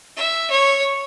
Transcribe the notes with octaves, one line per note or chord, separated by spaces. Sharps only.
E5
C#5